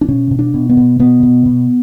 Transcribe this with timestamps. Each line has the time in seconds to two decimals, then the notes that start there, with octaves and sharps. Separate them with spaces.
0.01 D4
0.08 B2 C#4
0.31 B2
0.39 D4
0.54 B2
0.69 B3
0.77 B2
0.99 B2 B3
1.23 B2
1.46 B2